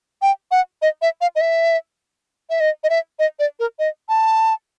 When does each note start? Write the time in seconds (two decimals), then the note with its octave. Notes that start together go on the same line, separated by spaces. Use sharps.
0.22 G5
0.51 F#5
0.82 D#5
1.02 E5
1.21 F5
1.35 D#5
1.41 E5
2.50 E5
2.60 D#5
2.84 D#5
2.90 E5
3.19 D#5
3.39 D5
3.60 A#4
3.79 D#5
4.09 A5